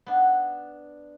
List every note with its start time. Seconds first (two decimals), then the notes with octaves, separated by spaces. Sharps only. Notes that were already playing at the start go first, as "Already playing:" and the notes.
0.06 B3 D4